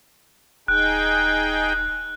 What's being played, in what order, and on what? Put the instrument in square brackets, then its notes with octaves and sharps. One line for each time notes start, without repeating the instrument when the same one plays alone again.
[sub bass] D#1 [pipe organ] D#4 G#4 G5 [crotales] F#6